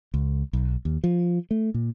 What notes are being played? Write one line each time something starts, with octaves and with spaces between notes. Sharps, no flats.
C#2
B1
D#2
F3
A3
A#2